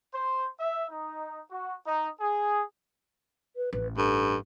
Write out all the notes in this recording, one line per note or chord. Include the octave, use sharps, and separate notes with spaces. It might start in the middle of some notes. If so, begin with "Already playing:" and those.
C5
E5
D#4
F#4
D#4
G#4
B4
A1 B4
G2 A4